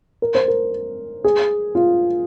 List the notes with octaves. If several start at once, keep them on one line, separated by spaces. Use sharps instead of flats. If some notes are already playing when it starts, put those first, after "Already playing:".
A#4
C5
A#4
G#4
F4